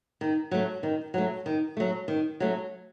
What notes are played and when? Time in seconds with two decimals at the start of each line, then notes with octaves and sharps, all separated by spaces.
0.21 D#3
0.51 F#3 A3
0.83 D#3
1.14 F#3 A3
1.46 D#3
1.77 F#3 A3
2.08 D#3
2.40 F#3 A3